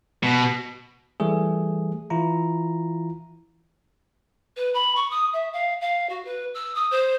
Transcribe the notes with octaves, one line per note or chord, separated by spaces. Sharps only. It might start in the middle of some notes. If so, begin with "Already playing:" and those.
B2
E3 G3 A3 G#4
E3 E4 F4 A#5
B4
B5
C#6
D#6
E5
F5
F5
F#4
B4
E6
D#6
C5